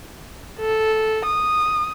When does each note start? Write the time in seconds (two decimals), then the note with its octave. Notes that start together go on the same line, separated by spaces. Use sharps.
0.60 A4
1.26 D#6